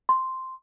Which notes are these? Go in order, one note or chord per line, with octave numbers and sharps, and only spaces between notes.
C6